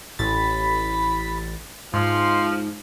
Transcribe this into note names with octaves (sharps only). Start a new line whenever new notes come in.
A1 B5 A6
G#2 F3 C6